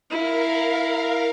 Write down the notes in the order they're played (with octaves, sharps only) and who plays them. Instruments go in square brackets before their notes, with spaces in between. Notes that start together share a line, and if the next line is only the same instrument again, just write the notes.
[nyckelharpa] E4 [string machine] A#4 F5